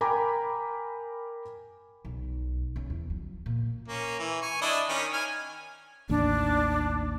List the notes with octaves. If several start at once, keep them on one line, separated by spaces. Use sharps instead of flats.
A#4 G5 G#5 A#5 B5 D6
B1
C#3
E2
F#3
A#2
A#3 C#4
E3
G#5 C#6
D4 E4 D#5
D#3 C#4
G#5 F6
A1 D#2 D4